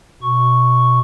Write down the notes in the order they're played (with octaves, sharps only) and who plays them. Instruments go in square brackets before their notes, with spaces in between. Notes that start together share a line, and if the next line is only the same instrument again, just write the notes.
[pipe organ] B2 C#6